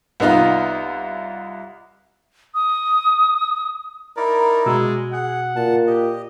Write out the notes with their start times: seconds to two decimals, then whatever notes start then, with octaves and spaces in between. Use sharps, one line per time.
0.20 C2 B3 D#4 F4
2.55 D#6
4.17 D#4 E4 A#4 D5
4.66 B2 G#3 F#4 E6
5.13 G#4 F#5
5.56 A#2 A5
5.87 G4 D#5